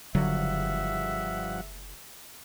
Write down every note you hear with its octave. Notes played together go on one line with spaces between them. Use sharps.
F#1 G2 D3 F3 F#3 E5 F#5